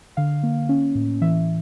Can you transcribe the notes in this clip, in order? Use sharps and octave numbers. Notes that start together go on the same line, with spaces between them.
D3 F5
A#3
C#4
A2
E3 E5